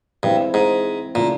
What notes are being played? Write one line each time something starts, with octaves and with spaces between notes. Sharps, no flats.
G2 E3 G#3 C4 E4 G4
G#2
A#2 C#3 E3 A3